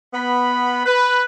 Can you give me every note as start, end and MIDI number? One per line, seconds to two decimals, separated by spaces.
0.14 0.82 59
0.14 0.82 83
0.86 1.25 71